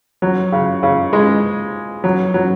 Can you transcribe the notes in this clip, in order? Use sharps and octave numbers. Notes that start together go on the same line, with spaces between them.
F#3
C#3
C#3
G#3
F#3
F#3